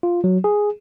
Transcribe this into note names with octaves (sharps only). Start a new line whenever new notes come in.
F4
F#3
G#4